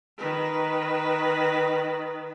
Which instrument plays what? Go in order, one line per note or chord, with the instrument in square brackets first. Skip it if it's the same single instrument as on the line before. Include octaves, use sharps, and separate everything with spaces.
[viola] D#3 B4